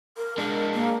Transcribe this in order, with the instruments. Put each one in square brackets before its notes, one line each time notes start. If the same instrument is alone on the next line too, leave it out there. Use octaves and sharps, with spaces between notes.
[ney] A#4
[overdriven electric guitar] G#3 D4 [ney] A#4
[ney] A#3